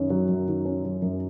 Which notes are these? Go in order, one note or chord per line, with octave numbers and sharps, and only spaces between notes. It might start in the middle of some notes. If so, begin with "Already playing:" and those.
Already playing: F#2 D#3 C#4
F#3
F#2
D#3
C#4
F#3
F#2